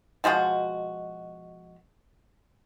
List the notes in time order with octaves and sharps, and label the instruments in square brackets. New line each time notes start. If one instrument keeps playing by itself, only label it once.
[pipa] B2 F3 G#3 F#4